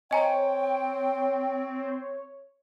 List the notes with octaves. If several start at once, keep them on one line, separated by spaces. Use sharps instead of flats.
C4 C#5 D#5 G5 G#5 A#5